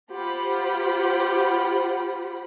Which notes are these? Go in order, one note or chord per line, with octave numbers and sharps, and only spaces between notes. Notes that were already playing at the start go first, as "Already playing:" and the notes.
F4 G4 C5 F#5 B5